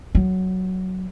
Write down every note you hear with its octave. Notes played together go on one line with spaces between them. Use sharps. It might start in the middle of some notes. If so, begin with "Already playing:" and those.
F#3